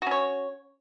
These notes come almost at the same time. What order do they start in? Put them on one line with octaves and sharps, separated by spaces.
F#4 C#4 C#5